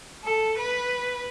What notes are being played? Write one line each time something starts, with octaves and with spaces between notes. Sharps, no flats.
A4
B4